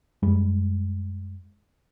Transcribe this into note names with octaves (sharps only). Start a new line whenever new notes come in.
F#2 G3 G#3